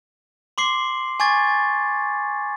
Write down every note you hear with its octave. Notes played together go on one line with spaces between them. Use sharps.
C6 D6 C7
G#5 C#6 D6 G#6 A6